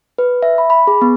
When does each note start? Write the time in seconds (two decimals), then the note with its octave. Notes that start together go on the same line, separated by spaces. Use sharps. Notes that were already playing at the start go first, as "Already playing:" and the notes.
0.18 B4
0.43 E5
0.58 B5
0.70 B5
0.87 G#4
1.02 B3